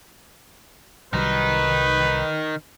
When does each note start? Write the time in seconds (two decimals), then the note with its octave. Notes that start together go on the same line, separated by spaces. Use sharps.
1.14 C2 D#3 F#3 G3 D#4 B4